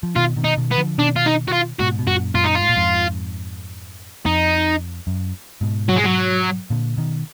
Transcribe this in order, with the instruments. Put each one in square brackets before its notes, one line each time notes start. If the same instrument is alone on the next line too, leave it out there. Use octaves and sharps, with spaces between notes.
[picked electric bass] F3
[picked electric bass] B2 D#3 [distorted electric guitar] F4
[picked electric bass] B2 D#3
[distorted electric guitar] D#4
[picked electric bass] B2 D#3
[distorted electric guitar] B3
[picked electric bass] D3 F3
[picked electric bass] B2 D#3 [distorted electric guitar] D4
[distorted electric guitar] F4
D#4
F#4
F4
[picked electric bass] G#2 B2 [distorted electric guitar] F#4
[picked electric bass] B2
[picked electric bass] F#2 A#2 [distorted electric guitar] F#4
[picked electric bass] F#2 A#2 [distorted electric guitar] F4
[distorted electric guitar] D#4
F4
[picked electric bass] G#2
A#2
F2 G#2
[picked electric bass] F2 [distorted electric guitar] D#4
[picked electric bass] F#2
G#2 B2
[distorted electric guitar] F#3
G#3
F#3
[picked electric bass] A#2 D3
B2 D#3